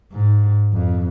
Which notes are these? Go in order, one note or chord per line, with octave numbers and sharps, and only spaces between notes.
G#2
F2